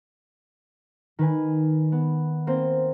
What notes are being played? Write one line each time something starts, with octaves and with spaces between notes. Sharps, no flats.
D#3 B4 G#5
B3
A#3 C4 C5